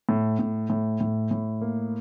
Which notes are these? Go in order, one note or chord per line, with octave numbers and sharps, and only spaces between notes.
A2
A2
A2
A2
A2
A#3